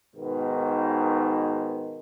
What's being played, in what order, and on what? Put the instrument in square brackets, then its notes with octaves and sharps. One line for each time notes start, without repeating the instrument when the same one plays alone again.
[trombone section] G#2 B2 D#3